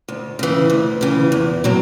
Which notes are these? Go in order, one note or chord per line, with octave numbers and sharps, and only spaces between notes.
D2
C#3 E3
D2
C#3 E3
E2
B2 F#3